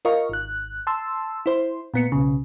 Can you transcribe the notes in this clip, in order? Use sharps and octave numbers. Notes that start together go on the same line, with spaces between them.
F4 A#4 D#5 F5 C#6
G#1 F#6
A5 C6 E6
E4 C5 C6
A#2 B3 C#7
B1 C#3